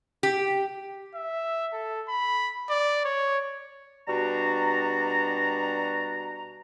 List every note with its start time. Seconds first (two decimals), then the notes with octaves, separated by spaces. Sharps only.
0.23 G4
1.15 E5
1.73 A4
2.09 B5
2.70 D5
3.05 C#5
4.08 B2 G3 D4 F#4 A#5